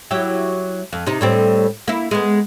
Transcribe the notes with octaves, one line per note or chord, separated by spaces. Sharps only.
F#3 E4 G4
F2
C3 D#4
A2 G3 C4
A#3 E4
G#3 A#3 B3